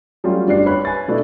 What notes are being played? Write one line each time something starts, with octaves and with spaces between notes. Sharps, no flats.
F#3 G3 A3 C#4 F4 F#4
G1 G3 D4 C7
B4 C#5 B5 F#6
G#5 A6
B2 A3 D4 E4